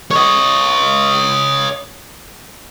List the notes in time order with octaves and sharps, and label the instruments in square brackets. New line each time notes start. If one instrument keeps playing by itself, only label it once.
[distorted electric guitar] C#5 D#5